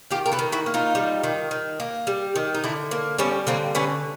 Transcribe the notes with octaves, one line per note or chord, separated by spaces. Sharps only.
D#3 F4 G4
A#4
A4 B4
D#3
E4 F#4
A#3
D#4 F4
G3
D#3
D#3
A#3
G3
D#3
D#4
D3 D4 E4
A#3
G3 B3 C#4
D3 A#3 C4
D3 B3 C#4